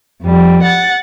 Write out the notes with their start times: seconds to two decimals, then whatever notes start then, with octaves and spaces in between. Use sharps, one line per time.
0.23 F2 G3
0.62 F#5 A6